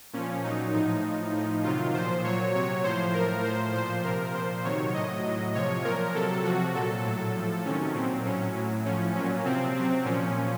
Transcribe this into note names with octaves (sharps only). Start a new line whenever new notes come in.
A#2 F3 C#4
A#2 F#3 D#4
A2 F3 D#4
A2 F3
A2 F3
C3 D#3 F#3 F4
A#2 F3 C5
A#2 F#3 C#5
C3 F#3 C#5
A2 F3 C5
A2 F3 A#4
A2 F3 C5
A#2 F3 C5
C3 F3 A#4
A#2 F3 C5
C3 D#3 F#3 C#5
A2 F#3 D#5
A2 F#3
C3 F3 C#5
A#2 F3 A#4
C3 F#3 A4
C3 F3 F#4
A#2 F#3 A4
A2 F#3
A2 F3
C3 D#3 F#3 C#4
A#2 F#3 C4
A2 F#3 C#4
A2 F#3
A2 F3 C#4
A#2 F#3 C#4
C3 F3 C4
C3 F#3 C4
A#2 F3 C#4